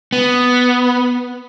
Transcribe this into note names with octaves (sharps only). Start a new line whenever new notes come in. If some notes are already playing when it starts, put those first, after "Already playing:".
B3